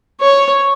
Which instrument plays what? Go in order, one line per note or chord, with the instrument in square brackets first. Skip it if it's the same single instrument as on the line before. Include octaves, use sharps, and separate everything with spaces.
[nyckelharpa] C#5